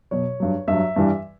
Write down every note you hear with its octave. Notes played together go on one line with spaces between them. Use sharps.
B2 F#3 C#5
G2 F#3
G2 F#3 E5
G2 E3 G3